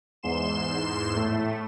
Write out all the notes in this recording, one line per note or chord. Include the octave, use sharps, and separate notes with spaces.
E2 G#2 C6 E7
A2 A3